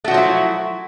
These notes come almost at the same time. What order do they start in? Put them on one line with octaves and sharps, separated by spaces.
A3 F#4 F3 F#3 E4